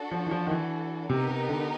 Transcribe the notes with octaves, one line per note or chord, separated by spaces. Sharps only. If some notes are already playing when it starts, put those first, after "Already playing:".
Already playing: D4 F#4 A4
F3
E3
F3
D#3
E3
C3 B3 D#4 G4 A#4
C3
D3